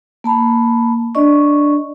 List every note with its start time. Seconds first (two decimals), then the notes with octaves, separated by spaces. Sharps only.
0.24 A#3 A5 B5
1.15 D4 D5 D#5 C#6